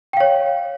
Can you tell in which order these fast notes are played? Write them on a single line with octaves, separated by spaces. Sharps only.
G5 F5 C#5